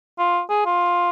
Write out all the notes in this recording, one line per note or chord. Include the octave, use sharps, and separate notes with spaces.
F4
G#4
F4